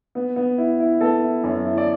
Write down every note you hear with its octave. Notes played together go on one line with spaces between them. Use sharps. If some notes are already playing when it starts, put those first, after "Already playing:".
B3
B3
E4
E4
B3 A4
E4
F#2
E4
D5